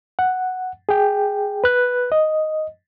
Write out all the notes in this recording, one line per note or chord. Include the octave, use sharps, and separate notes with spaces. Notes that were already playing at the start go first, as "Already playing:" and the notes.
F#5
G#4 G5
B4 F#6
D#5